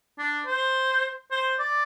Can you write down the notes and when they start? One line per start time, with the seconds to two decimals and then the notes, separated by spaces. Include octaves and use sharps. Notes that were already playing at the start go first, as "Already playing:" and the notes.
0.18 D4
0.46 C5
1.31 C5
1.59 D5